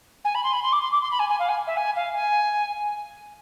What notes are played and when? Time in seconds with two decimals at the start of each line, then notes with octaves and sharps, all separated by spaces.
0.24 G#5
0.34 B5
0.43 C6
0.53 B5
0.63 C6
0.72 D6
0.81 C6
0.91 D6
1.01 C6
1.11 B5
1.19 G#5
1.29 G#5
1.39 F5
1.49 G#5
1.67 E5
1.77 G#5
1.95 F5
2.15 G#5